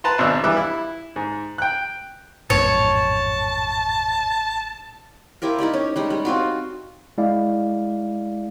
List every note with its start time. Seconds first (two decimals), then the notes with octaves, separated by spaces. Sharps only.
0.04 B4 A5 A#5 C6
0.18 G#1 B2 D4 E6 F#6
0.43 E3 G3 E5 D6 F#6
0.57 E4
1.16 G#2
1.58 G5 F#6
2.50 A1 F2 G#2 B2 C#5 A5
5.42 E4 F4 G4 A#4
5.58 D#4 E4 G4 D5
5.73 C#4
5.96 G3 G#3 D#4
6.10 G3
6.25 C4 F4 F#4
7.18 G#3 E4 D5 F5